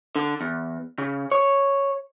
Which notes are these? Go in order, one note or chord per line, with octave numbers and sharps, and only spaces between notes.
D3
E2
C#3
C#5